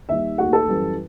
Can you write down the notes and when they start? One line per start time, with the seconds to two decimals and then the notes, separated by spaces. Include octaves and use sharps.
0.09 D#2 D#3 G3 E5
0.38 D#2 D#3 A3 F#4 F#5
0.53 A4 A5
0.68 F#2 E3 G3